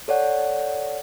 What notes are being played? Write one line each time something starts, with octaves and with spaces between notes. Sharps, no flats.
A4 C#5 D5 F#5